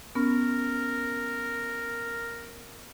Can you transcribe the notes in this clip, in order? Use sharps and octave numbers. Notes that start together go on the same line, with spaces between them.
B3 C#4 A#4